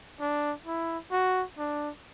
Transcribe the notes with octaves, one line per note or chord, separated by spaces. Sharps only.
D4
E4
F#4
D4